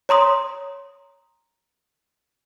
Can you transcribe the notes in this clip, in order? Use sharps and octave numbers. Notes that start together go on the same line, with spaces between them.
C#5 A#5 C6 D#6